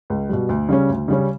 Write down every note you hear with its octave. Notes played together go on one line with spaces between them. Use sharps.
C#2
B2 G3
D2
C#3 G3 C#4
D2
C#3 G3 C#4